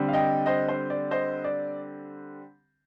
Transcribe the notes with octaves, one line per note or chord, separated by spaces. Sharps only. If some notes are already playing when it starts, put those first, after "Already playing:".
Already playing: D3 G3 C4
F5
D#5 G5
C5 D#5
C5
D5
C5 D#5
D5